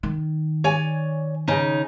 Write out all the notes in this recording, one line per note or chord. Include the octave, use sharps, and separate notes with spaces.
D#3
C#5 D5 G#5
C#3 D#4